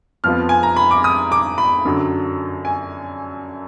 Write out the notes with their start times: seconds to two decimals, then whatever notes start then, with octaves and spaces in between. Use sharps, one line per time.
0.24 F2 F3 B3 F4 F6
0.49 G#5
0.63 A#5
0.76 B5
0.91 D6
1.04 D#6
1.32 D6
1.58 B5
1.85 F#2 D3 F#3
2.65 G#5